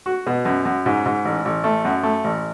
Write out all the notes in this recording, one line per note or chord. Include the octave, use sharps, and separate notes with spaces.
F#4
B2
F#2
F#2
G#2
G#2
A1
A1
A3
F#2
A3
A1